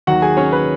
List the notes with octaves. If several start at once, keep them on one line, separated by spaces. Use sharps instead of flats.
D#2 D#3 F#3 F#4 F#5
G#4 G#5
C#4 C#5
B4